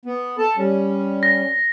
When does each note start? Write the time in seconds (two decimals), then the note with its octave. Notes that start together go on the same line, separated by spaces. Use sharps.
0.05 B3
0.38 A4 A5
0.57 G3 C#4
1.23 A#6